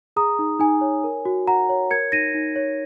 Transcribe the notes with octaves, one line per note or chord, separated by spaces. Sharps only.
G#4 A#5 D#6
D#4
D#4 G#5
C#5
A#4
F#4
F#4 F#5 A#5
C#5
A#4 G#6 C#7
D#4 A#6 D#7
D#4
C#5